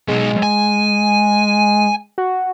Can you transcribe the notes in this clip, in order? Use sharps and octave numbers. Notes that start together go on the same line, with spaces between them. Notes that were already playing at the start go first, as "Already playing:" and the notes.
B2 F#3 G#3
G#5
F#4